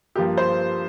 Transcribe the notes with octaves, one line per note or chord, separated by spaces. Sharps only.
G2 F3 A#3 G4
C5